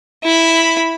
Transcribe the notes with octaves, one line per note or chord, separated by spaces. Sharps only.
E4 B5